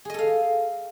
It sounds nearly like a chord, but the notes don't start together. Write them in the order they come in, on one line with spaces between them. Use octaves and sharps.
G#4 D#5 A4 F5